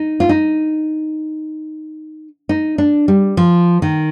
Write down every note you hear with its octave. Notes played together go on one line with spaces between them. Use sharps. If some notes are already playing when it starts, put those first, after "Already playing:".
Already playing: D#4
F4
D#4
D#4
D4
G3
F3
D#3